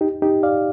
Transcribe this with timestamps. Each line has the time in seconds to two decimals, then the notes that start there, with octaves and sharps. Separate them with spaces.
0.01 D#4 G4
0.22 D#4 G4
0.43 D5 F5